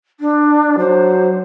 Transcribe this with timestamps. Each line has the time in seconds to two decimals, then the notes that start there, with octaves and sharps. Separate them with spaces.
0.20 D4
0.78 F#3 C5